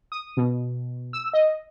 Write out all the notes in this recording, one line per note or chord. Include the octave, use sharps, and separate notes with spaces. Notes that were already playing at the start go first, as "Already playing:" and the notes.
D#6
B2
E6
D#5